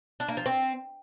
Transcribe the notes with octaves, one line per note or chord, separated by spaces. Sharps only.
D4
A#3
F3
C4